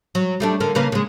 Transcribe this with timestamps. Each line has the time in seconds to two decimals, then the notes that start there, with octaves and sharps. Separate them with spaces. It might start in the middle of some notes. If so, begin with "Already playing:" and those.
0.15 F#3
0.40 G3 A3 D4
0.60 D3 A#3
0.75 C#3 A#3 B4
0.92 C#3 G#3